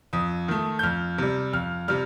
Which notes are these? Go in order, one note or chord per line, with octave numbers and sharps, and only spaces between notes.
F2 D#6
D#3 A3
G6
F2 F6
C3 G3
F2 F6
C3 G3 F6